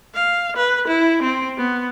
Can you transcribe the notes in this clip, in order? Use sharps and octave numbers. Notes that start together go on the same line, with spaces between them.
F5
B4
E4
C4
B3